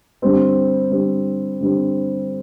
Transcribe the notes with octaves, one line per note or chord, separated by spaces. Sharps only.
D3 G3 C4
D3 G3 C4
D3 G3 C4